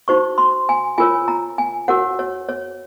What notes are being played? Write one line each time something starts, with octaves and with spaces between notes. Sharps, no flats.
D#4 F#4 C5 C#6
C6
G#5
F4 A#4 C#5 G#5
A#5
G#5
F#4 A#4 C#5 F#5
C#5
C#5